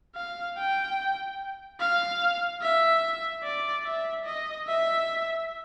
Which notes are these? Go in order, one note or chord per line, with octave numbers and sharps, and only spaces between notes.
F5
G5
F5
E5
D5
E5
D#5
E5